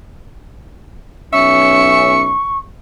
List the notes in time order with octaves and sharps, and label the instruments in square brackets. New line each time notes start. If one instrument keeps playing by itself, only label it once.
[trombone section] B1 C#4 [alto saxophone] E5 [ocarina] C#6 [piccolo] C#7